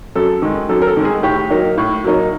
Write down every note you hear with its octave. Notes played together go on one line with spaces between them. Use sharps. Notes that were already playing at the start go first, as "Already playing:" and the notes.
F#2 A4
D#3 G#3
F#2 A4
A#4
A4
D#3 G#3
G#4
A2 G4
F#3 A#3 D#4
A2
F#3 A#3 D#4